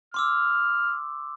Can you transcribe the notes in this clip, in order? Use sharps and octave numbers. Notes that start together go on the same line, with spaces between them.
C6 D6 E6 F6